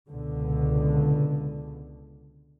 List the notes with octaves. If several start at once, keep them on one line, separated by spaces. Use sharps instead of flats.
C#2 B2 D3